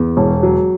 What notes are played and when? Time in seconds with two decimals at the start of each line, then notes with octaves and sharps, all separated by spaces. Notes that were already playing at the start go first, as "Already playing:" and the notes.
Already playing: E2
0.17 E1
0.43 F#3